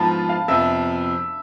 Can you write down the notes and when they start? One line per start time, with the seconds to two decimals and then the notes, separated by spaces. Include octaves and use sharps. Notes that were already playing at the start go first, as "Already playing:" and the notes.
Already playing: G#2 F3 B3 F4 A5 B5
0.29 F5
0.48 F2 C3 F3 B3 E5